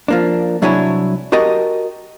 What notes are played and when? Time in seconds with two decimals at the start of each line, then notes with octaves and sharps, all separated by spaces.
0.08 F3 A#3 D4
0.62 C2 F#3 D4 E4 C#5 G#5
1.32 F#4 G4 A#4 D#5 A5